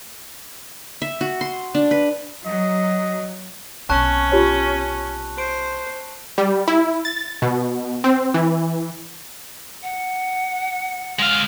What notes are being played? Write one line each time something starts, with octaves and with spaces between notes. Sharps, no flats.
E5
F#4
C6
D4
B4
F#3 D#5
B1 C3 C#4 A5 C#6 F#6
F4 G4 C#5
C5 D7
G3
E4
A6
B2
C4
E3
F#5
G#3 F5